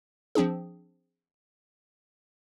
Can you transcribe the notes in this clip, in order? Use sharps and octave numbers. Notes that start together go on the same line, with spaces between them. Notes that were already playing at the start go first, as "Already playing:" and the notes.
F3 C4 D4 G#4